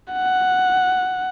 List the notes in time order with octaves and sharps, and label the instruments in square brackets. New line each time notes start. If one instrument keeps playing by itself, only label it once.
[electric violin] F#5